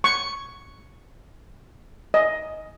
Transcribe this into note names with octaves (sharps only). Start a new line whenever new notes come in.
C#6
D#5